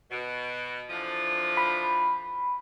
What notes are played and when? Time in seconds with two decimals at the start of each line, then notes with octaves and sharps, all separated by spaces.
0.11 B2
0.90 D3 E3 F3
1.57 B5